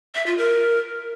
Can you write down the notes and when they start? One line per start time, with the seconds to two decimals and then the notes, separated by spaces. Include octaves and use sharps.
0.15 E5
0.26 F4
0.38 A#4